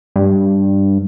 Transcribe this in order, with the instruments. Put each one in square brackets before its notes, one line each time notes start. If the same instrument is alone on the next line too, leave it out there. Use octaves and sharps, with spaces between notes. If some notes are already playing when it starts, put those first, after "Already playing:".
[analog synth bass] G2